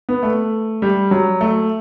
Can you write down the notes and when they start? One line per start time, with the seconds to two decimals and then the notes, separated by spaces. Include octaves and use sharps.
0.09 B3
0.23 A3
0.82 G3
1.11 F#3
1.41 A3